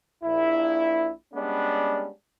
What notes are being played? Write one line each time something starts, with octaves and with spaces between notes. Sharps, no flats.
A#1 E4
G3 G#3 B3 C#4 D4